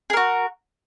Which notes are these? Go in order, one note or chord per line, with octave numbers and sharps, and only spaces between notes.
F#4 G#4 A#4